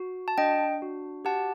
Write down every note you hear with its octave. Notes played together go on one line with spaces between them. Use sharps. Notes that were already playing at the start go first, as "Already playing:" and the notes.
Already playing: F#4
A5
D4 D#5 G5
F#4
G4 F#5 A5